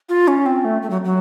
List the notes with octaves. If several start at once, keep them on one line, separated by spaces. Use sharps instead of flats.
F4
C#4
C4
A3
A3
F#3
F#3